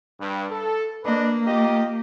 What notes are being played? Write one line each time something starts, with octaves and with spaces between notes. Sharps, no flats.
G2
A4
A#3 D4 B4 D#5
F4 G4 D#5